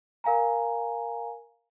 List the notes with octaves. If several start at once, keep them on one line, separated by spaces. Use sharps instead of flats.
A#4 F5 G#5 A#5